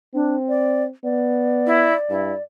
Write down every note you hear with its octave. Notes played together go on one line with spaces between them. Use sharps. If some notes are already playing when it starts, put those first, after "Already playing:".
C4 D4
D5
B3 D5
E4
G2 E4